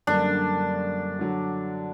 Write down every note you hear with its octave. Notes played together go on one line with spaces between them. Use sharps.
F#2 D3 G3 A#3 D4
D3 F#3